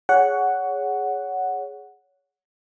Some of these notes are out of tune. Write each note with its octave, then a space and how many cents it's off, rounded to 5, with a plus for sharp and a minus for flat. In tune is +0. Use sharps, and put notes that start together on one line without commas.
G#4 +0 C#5 +20 F#5 +0